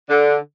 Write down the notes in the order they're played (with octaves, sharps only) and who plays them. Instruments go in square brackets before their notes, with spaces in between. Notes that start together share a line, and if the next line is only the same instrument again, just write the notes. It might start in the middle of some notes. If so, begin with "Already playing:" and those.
[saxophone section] D3